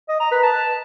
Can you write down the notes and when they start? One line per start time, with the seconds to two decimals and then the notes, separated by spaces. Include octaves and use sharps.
0.09 D#5
0.20 A#5
0.32 B4
0.43 A5